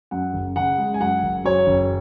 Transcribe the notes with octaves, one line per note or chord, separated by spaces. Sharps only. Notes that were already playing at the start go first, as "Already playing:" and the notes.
F#2 F#5
F#1
C#3 F#5
G#3
G#5
F#2 F#5
F#1
F#3 C#5
F#1